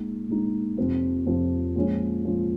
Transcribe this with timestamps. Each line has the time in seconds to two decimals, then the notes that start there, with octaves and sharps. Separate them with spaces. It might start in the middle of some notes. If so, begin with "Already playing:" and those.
Already playing: A#2 G#3 D#4
0.28 A#2 G#3 D#4
0.77 F2 C3 F3 C4 F4
1.26 F2 C3 F3 C4 F4
1.76 A#2 F3 G#3 C#4 F4
2.24 A#2 F3 G#3 C#4 F4